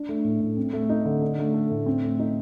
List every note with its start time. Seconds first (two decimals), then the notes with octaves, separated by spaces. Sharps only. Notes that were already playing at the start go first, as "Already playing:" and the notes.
Already playing: D4
0.09 A3
0.24 A2
0.40 A2
0.57 C4
0.73 A3
0.89 D#4
1.05 D3
1.22 D4
1.39 A3
1.54 A4
1.71 A2
1.86 C4
2.03 A3
2.19 D#4